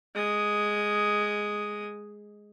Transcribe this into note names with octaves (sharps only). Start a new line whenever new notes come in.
G#3 D#6